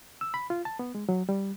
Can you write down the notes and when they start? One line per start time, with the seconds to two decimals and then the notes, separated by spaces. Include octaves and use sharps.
0.21 E6
0.34 B5
0.50 F4
0.65 A5
0.79 B3
0.95 G#3
1.09 F#3
1.29 G3